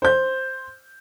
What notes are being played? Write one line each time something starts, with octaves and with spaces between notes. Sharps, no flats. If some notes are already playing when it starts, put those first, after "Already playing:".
C5 G6